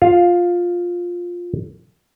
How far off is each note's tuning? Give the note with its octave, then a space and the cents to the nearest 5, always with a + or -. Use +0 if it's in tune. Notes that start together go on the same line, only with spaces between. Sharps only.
F4 +10 F5 +0